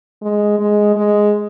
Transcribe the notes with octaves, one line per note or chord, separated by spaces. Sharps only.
G#3
G#3
G#3